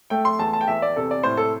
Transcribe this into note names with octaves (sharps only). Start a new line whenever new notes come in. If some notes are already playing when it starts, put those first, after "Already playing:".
A3 G5
C6
E2 A5
A5
G5
E2 E5
D5
C3 A4
D5
A2 C5
A4